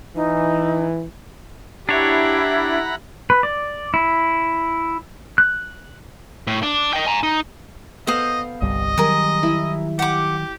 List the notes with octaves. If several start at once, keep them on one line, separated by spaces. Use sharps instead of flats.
E3 D#4
D4 E4 G4 C#5 F#5 A#5 B5
B4
D5
E4
F#6
A2
D4
D#5 G5
G#5 A#5
D#4
B3 A4 C5 D#5 F5 D#6
G1 C2 G3 D#5
D#3 F#3 G3 G#4 A#4
E4
G4 F#5 D6